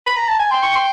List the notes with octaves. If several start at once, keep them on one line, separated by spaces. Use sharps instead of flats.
B5
A#5
A5
G#5
G5 C6
C#6
C6